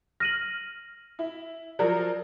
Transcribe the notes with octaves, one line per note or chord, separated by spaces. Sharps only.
F6 A#6 D#7 F#7
E4
F3 F#3 A#4 D5